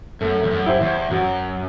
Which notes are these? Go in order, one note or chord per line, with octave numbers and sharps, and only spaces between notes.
F#2 A3
E2
F#2
E4 G4 C5
E2
F#2 F#3